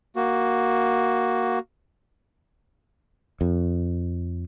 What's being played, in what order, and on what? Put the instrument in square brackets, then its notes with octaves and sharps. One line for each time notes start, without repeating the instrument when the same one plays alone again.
[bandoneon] A#3 F#4
[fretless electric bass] F2